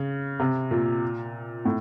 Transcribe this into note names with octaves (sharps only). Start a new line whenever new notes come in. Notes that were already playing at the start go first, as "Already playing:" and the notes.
Already playing: C#3
C3
A#2
A2